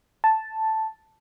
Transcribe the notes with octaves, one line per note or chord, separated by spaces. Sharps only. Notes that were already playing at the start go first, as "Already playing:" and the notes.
A5